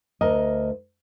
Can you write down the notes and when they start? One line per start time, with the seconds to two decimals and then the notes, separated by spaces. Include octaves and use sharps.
0.21 D2 A#4 D#5